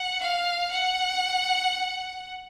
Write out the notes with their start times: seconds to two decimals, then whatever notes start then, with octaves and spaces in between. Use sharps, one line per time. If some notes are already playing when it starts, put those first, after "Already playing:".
Already playing: F#5
0.21 F5
0.71 F#5